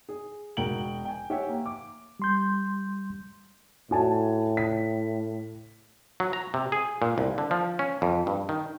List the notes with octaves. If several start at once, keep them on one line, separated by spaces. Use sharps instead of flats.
G#4
E1 F#4 A#4 G5 D7 F#7
G5 G#5
G4 C#5 E5 F#5 G#5
A#3
D6
G3 C6 G6
A2 F#4 G#5 A5
B6
F#3
A#5
C3
G#4
A#2
C2
D3
F3
C#4
F2
G2
D#3